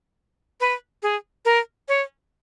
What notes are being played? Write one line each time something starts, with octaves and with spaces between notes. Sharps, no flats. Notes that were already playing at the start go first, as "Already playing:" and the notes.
B4
G#4
A#4
C#5